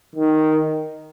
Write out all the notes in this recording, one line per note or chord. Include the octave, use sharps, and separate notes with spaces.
D#3